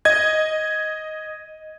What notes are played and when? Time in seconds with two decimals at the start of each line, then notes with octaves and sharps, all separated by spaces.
0.05 D#5 G#6